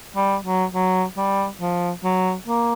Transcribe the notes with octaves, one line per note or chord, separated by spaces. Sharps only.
G3
F#3
F#3
G3
F3
F#3
A#3